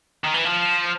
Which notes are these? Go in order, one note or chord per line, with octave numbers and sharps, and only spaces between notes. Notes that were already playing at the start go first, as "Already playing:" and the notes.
D#3
E3
F3